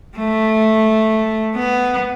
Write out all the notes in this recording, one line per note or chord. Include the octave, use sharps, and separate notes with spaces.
A3
B3